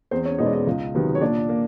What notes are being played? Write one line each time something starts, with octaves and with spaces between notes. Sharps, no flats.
E2 C4 C5
C#4 C#5
B2 G#3 B3 D#4 D#5
D5
D#4 D#5
C#2
C3 D#3 F#3 B3
C#5
A#2 D4 D5
A#3